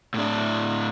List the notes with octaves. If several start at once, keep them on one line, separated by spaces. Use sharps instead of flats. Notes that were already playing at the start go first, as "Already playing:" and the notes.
A2 D4